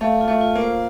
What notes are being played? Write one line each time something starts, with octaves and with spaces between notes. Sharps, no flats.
A3 F5
F4
A3
F4
A#3
C5